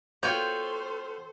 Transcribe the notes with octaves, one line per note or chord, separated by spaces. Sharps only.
B3 F4 F#4 A4 C5 C#5 G5 G6